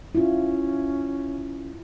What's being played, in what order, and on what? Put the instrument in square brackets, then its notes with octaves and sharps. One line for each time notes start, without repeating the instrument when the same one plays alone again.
[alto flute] C#4 [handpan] E4 F4